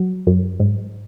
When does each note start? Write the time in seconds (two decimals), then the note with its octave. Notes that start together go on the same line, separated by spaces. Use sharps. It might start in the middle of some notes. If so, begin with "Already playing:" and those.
Already playing: F#3
0.27 F#2
0.60 G#2